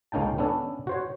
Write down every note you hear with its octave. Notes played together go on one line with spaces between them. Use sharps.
C#2 A#3 C#4 D#4 G5 A5
B3 C#4 D4 A4
F#4 C5 C#5